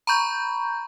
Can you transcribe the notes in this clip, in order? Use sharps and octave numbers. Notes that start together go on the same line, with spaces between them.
A#5 B5 C#6 G6